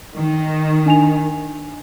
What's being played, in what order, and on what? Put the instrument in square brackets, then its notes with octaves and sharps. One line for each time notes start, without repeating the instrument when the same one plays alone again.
[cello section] D#3
[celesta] D4 G#5 F7